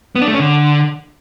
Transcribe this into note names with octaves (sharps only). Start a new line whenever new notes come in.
B3
D4
A3
C#4
D3